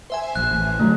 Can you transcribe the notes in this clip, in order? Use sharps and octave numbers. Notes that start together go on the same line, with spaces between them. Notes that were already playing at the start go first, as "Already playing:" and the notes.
C5 E5 G#5
A#1 F#6
A1
D3 F#3 A3